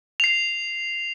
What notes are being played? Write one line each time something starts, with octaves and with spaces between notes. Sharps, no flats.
C7 F7